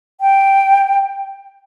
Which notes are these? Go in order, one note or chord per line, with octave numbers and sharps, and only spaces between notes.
G5